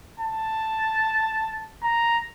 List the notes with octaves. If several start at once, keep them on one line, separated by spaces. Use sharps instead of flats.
A5
A#5